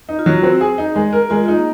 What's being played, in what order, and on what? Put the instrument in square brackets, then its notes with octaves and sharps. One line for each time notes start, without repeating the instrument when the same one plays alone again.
[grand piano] D#4
[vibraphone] F4
[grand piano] F#3 [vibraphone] F#4
[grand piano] C4
G#4
D#4
G#3
A#4
[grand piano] G#3 [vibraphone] F4
[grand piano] D#4
[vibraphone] A#3